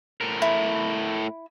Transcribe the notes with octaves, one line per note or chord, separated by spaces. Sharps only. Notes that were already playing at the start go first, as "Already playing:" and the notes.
A2 A#4
E4